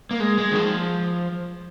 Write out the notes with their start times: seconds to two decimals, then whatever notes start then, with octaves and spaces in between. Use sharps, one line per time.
0.11 A#3
0.20 G#3
0.38 G#3
0.51 D#3
0.56 F3